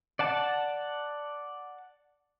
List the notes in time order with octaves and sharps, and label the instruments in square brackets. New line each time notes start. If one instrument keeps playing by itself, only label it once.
[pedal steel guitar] D5 F#5 A5